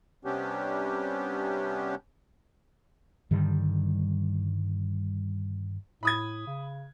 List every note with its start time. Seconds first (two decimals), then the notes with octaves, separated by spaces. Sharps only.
0.25 C3 G3 B3 C#4 D4 G4
3.31 G2 D3 D#3 G3
6.03 A2 B5 D#6 G#6
6.47 C#3